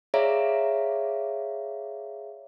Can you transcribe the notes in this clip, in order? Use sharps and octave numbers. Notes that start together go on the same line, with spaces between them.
G#4 C#5 D5 E5 F5 A#5